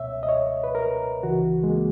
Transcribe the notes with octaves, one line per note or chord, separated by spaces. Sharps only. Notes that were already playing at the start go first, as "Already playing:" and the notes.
Already playing: C#2 B2 C#5 E5
D#5
C#5
B4
A#4
C#2 C#3 E3 F#4
G#3
A#3